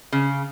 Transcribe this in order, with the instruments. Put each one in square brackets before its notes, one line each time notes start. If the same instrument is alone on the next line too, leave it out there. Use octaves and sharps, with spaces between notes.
[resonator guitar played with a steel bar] C#3